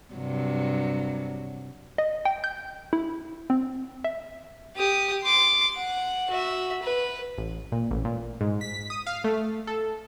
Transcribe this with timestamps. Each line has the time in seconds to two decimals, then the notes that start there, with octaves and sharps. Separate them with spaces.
0.14 G2 C3 F#3
1.98 D#5
2.25 G5
2.44 G6
2.93 E4
3.50 C4
4.04 E5
4.76 G4 D#6
5.24 C6 D6
5.76 F#5
6.31 F#4 E5
6.82 B4
7.38 A1
7.72 A#2
7.91 A1
8.05 A#2
8.41 G#2
8.61 B6
8.90 D#6
9.07 F5
9.24 A3
9.67 A4